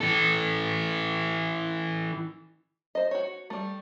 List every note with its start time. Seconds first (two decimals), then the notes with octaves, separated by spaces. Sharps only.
0.01 E3 A4
2.95 C5 D#5
3.11 F#4 C#5
3.50 G3 A3